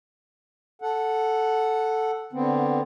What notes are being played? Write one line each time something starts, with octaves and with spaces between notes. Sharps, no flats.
A4 F#5
D3 B3 C4